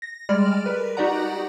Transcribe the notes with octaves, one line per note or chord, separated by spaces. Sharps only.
A#6
G3 G#3 D5 F6
A#4 B4
D#4 F#4 G4 D5 F#5 A#5